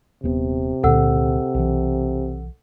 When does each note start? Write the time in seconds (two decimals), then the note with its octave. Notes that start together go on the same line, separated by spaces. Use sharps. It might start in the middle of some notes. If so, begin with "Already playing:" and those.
0.24 D#1 C3 B3
0.83 C#2 A#2 D3 A4 F#5 E6
1.54 B1 E3